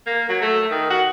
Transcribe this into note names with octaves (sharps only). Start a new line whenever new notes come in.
A#3
F#3
A3
D#3
F#4